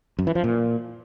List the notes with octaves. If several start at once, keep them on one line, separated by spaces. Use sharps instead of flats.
F#2
E3
F3
A#2